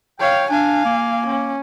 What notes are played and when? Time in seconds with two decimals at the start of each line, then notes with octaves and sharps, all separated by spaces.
0.20 C#5 F5 G5
0.50 D4 F5 G#5
0.85 A#3
1.27 C#4